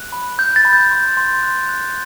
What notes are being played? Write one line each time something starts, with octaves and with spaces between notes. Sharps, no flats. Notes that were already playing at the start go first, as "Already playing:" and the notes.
Already playing: F#6
B5
B5 G6
A6
B5
G6
C6
C6
F#6
F#6